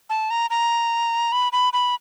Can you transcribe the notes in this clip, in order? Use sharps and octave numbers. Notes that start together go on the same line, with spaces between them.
A5
A#5
A#5
B5
B5
B5